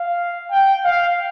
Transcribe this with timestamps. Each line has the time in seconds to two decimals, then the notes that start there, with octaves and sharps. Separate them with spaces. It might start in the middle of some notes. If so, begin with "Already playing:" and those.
Already playing: F5
0.51 G5
0.84 F5